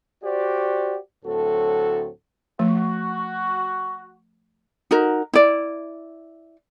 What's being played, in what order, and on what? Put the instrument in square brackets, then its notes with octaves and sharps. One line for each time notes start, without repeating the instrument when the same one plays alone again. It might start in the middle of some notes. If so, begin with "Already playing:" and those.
[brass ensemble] F#4 G4 C5 D5
D2 A2 F#3 C4 F#4 A4
[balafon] F3 A3 [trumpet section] F#4
[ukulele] D#4 F#4 A#4
E4 D5